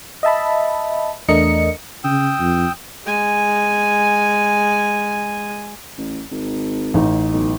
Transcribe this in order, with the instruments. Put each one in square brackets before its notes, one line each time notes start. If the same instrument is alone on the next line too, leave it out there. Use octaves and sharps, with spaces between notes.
[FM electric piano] D#5 E5 A5 B5
E2 A3 D4 A#4 D#5 C#7
[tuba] C#3 [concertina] G5 D#6 E6
[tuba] F2
[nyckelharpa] G#3 G#5
[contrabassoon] A1
G#1
[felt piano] A1 D#4
[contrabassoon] B1